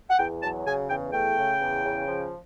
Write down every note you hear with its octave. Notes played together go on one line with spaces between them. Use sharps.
F#5
E2 G5
F#3 A5
C#3 G#5
E2 G5
A3 G5
C#3
E2
C#3
F3